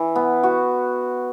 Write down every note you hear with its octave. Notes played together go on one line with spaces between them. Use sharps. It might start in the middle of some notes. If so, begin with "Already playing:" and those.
Already playing: E3
B3
F#4